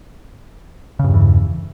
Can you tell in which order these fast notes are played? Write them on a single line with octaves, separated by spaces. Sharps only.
C#3 G2 E2 E3